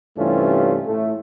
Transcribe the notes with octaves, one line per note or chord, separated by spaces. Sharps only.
G2 C3 E3 A3 C#4 F4
A2 A3